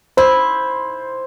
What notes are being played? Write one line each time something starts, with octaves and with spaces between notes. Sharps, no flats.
E4 C5